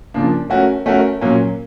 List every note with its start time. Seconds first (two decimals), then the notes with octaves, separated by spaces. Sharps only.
0.14 C#3 F3 A#3 D4
0.50 A3 C#4 F#4 A#4
0.86 A3 C#4 F#4 A#4
1.21 A#2 F#3 A#3 C#4